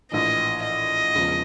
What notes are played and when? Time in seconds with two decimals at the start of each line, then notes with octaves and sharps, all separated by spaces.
0.12 A#1 A2 E3 D#5
0.63 D#5
1.15 E1 E2 C#3 F3